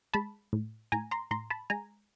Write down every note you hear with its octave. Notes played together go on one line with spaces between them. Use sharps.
G#3 A5 B5
A2
A2 G#5 A#5
A#5 C6
A2 A#5 C6
A5 B5
G#3 G#5 A#5